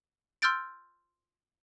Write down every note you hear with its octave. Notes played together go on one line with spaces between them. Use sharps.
C6 E6 F6 G6 A6 D7